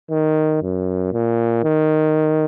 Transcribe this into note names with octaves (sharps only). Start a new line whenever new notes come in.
D#3
F#2
A#2
D#3